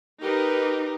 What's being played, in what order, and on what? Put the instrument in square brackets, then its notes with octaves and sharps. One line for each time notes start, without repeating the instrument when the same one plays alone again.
[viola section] D#4 G4 [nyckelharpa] A#4 B4